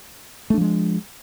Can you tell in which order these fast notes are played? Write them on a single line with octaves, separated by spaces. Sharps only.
A3 D4 F3 G#3